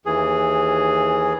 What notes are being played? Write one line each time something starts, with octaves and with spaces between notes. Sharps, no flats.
D#2 E3 G#4